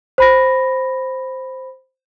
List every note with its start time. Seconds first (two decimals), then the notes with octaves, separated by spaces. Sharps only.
0.18 C5 B5 A#6